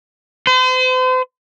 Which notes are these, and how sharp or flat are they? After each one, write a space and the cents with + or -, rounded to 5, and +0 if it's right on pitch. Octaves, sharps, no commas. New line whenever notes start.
C5 -40